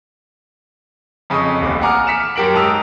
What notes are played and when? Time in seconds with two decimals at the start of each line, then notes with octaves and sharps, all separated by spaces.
1.30 F2 C#3 D#5 C#6 D#6
1.61 D#1 A1 D#2 D6
1.81 F#5 G#5 A#5 D6 D#6 F6
2.07 F6 B6 C#7 E7
2.36 F#2 G4 A#4 D7 F#7
2.54 G#2 A5 A#5 D#6 E6 F7